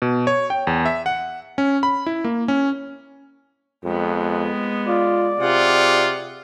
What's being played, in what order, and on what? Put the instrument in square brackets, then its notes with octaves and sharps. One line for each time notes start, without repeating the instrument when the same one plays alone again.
[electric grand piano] B2
C#5
G5
E2
E5
F#5
C#4
B5
E4
A#3
C#4
[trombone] F2 [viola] G#3 B3
[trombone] F4 [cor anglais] D5
[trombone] C3 [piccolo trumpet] F4 [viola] G#4 F#5